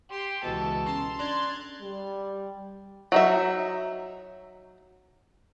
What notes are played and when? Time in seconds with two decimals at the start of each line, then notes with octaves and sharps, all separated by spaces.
0.10 G4 C6
0.43 C#2 B2 E3 G#3 A4
0.86 C#4 A5 A#5 C6
1.19 D4 A#5 C6 F#6 G#6 A6
1.82 G3
3.12 F#3 D#4 E5